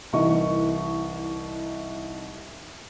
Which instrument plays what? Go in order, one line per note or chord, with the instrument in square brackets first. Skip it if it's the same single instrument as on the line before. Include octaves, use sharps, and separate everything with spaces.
[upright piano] C2 E3 D#4 D#5 C#6